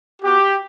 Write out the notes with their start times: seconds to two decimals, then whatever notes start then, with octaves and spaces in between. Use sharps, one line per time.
0.22 B3 F#4 G4